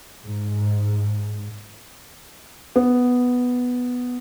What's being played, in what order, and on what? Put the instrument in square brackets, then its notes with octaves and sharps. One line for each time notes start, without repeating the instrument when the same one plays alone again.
[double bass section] G#2
[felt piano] B3